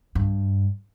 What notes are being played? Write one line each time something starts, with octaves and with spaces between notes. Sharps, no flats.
G2